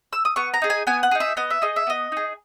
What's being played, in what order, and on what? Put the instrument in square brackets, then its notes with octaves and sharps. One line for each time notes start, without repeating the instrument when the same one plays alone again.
[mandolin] E6
D#6
B3 C#6
A#5
D#4 G#4
G#5
B3 G#5
F#5
D#4 G#4
E5
B3 D#5
E5
D#4 G#4 D#5
E5
B3 D#5
D#4 G#4